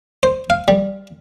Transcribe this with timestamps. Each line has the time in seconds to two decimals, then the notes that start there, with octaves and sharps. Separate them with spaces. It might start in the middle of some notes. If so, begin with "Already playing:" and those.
0.23 C5
0.50 F5
0.68 G3